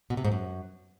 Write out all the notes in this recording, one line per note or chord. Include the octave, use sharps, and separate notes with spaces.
B2
C3
G#2
F#2